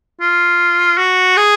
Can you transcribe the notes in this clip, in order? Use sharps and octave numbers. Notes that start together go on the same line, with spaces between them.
F4
F#4
G#4